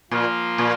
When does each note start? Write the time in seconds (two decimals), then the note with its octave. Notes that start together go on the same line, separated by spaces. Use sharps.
0.11 A#2 F3 A#3 F4
0.58 A#2